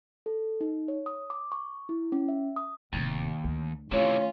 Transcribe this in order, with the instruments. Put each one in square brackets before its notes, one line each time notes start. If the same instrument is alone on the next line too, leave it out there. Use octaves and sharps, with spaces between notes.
[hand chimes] A4
D#4
C#5
D#6
D6
C#6
E4
C#4
E5
D#6
[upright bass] D1 C3 [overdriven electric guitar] D#2
[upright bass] D2
[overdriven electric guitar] C3 E3 [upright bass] D#3 A3 [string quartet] C#4 F4 [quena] C#5